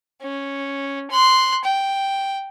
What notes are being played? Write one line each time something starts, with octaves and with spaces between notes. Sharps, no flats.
C#4
C6 F#6
G5